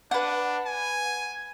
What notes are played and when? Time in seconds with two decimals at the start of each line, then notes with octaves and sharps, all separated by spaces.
0.11 D4 B4 F#5
0.66 G#5